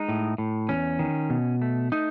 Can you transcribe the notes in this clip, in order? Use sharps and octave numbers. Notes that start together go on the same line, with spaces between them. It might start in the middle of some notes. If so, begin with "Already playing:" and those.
Already playing: G#3 D#4
A2
A2
E2 C#4
D#3
B2
A3
A3 D#4